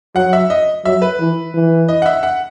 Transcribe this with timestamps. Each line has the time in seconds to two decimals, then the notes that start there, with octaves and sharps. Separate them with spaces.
0.16 F#3 F#5
0.33 E5
0.50 D#5
0.85 F#3 E5
1.02 B4
1.20 E3
1.54 E3
1.88 D#5
2.02 F#5
2.06 E5
2.23 F#5